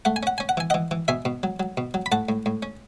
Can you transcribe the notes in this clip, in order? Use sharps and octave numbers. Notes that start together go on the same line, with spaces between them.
A3 F#5
G#5
C#4 F#5
C#4 G#5
F#5
E3 G#5
E3 D#5 F#5
E3
B2 E5 G#5
B2
F#3
F#3
B2
F#3
B5
A2 F#5 A5
A2
A2
C#4